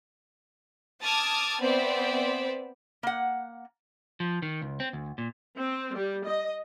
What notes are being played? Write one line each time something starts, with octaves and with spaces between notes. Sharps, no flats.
A5 D6 D#6 F6 G#6 A6
B3 C4 C5 D5 E5
A#3 F#5
F3
D#3
C#2
C4
D2
A#2
C4
G3
D#5